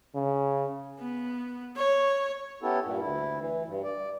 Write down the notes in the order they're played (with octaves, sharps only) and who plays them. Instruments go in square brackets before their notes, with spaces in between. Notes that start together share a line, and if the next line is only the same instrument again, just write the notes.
[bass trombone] C#3
[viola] B3
C#5
[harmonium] B3 C#4 E4 G4 A4
G2 A#2
D2 E4
E3
G2
D5